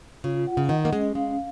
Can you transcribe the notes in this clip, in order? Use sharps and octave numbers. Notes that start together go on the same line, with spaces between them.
C#3 F4
F#5
C#3
D#3 D#5
A#3
G#3 C#4
G#3 F5